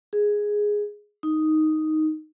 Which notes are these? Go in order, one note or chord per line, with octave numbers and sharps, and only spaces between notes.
G#4
D#4